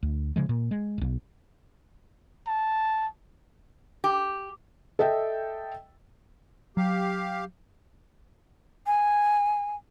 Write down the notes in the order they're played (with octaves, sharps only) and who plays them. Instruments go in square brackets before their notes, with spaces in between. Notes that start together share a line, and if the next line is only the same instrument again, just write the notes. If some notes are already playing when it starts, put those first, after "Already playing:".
[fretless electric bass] D2
C#3 F3 G#3
A#2
G#3
E1 B1
[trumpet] A5
[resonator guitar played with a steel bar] G4
[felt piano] A4 D#5 E5 G5
[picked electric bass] F#3 [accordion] G4 F5
[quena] G#5